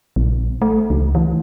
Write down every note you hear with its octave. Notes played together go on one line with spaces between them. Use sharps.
A#1
A3
C#2
E3